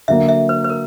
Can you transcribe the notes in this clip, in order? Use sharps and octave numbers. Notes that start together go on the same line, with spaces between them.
D3 F#3 A#3 E5
E5
B4
B4
A#4